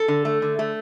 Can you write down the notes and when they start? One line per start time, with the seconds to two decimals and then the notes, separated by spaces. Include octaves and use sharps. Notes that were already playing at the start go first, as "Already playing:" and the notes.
Already playing: A4
0.08 D3
0.25 A3
0.42 D3
0.59 A3